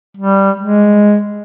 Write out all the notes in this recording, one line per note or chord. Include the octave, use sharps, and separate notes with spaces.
G3
G#3